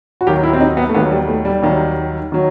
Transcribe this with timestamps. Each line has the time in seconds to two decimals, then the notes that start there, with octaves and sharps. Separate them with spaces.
0.21 F#4
0.27 D#2 D#3 F#3 G4
0.43 E4
0.53 C4
0.60 D#4
0.77 B3
0.89 A3
0.94 D#2 D#3 F#3 B3
1.11 G3
1.28 A3
1.45 G3
1.62 D#2 D#3 F#3
2.32 D#3 F#3